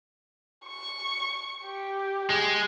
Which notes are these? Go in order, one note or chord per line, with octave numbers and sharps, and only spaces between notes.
C#6
G4
G#3